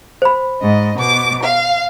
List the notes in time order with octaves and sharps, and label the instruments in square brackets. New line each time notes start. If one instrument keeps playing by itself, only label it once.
[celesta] C5 B5
[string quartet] G#2 D#5
B2 D6
F5